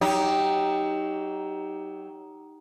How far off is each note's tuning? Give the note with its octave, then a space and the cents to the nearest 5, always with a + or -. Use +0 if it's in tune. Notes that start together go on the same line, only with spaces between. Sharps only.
F#3 +25 D#4 +0 G4 +0